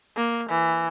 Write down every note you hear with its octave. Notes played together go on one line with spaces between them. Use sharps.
A#3
E3